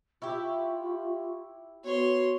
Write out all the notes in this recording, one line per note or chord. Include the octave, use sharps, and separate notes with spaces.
E4 F4 G4 C#6
B3 F#4 C#5 C6